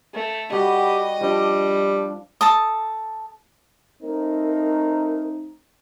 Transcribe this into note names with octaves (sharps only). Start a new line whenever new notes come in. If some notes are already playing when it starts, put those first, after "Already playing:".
A3
G3 F#4 G4 B4 D#5
F3 G3 D4
A4 A5 D#6
A3 C4 D#4 A#4